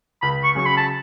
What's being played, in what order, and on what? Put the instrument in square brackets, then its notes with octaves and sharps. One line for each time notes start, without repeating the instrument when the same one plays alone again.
[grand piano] C#2 [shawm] B5
[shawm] C#6
[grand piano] C#3 F#3 C#4 [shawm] C#6
[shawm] B5
A5